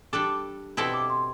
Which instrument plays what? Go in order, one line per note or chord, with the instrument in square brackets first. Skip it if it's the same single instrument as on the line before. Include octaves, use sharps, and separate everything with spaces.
[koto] G3 D4 A4 [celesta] D6
[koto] B2 G3 C4 E4 A4 [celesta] E6
[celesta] D6
C6